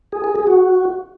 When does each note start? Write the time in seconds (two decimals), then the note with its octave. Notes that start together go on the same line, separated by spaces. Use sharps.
0.12 G#4
0.24 G#4
0.35 G#4
0.47 F#4